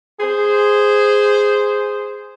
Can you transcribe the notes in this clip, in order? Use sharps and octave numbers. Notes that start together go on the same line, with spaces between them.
G#4 C5